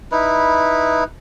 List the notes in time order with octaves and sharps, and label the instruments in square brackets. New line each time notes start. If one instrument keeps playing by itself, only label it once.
[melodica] D#4 E4 B4